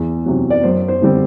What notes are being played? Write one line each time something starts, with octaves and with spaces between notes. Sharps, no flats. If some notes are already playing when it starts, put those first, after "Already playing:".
Already playing: E2
C3 F#3
D5
F#2 C5
C5
D3 G3 C4